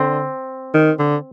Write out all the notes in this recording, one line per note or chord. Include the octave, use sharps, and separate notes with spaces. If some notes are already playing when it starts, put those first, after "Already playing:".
Already playing: D3 C4
D#3
D3